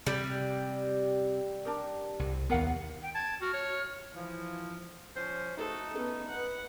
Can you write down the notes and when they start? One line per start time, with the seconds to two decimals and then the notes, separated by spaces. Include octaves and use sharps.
0.07 C3 G3
1.65 D4 G4 A#4
2.19 C2
2.50 D#2 B3 A#4 F5 F#5
3.03 G5
3.15 A5 G#6
3.41 F#4 F6
3.54 C#5
4.15 E3 F3
5.16 F3 C#4 C5
5.57 A3 D#4 F#4 A4
5.95 B3 C#4
6.28 B4 F#5